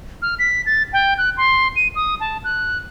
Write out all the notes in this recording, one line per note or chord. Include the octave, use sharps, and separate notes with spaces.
F6
B6
A6
G5
F#6
C6
D#7
D#6
A5
F#6